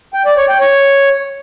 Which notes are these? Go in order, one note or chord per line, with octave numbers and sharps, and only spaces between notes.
G5
D5
C#5
G5
C#5